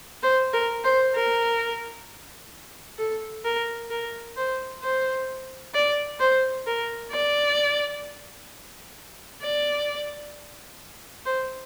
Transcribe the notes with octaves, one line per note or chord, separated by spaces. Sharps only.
C5
A#4
C5
A#4
A4
A#4
A#4
C5
C5
D5
C5
A#4
D5
D5
C5